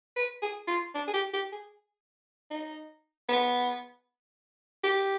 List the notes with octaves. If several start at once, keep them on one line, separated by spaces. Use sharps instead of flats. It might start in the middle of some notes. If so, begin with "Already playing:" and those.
B4
G#4
F4
D4
G#4
G4
G4
G#4
D#4
B3
G4